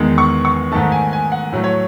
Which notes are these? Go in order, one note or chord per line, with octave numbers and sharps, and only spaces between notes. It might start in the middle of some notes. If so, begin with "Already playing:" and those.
Already playing: E2 D#3 G#3
C#6
C#6
G#2 D#3 A3 A5
G#5
G#5
F#5
A2 F#3 A3
C#5